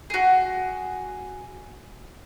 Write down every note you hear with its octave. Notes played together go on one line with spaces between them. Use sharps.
F#4 G#4